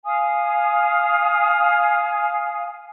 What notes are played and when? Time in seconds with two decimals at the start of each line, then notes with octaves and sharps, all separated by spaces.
0.05 F5 G#5 D#6